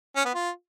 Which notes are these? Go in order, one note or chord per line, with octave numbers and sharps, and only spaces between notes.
C#4
B3
F4